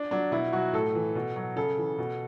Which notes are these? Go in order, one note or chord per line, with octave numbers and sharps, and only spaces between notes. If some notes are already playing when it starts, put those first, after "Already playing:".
Already playing: D4
F#3 D4
B2 E4
F#3 F#4
A2 A4
E3
B2
F#3
C#3 A4
E3
B2